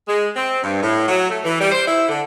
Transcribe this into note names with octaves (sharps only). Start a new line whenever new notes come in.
G#3
C4
G2
A2
F#3
A3
E3
G3
C5
E4
D3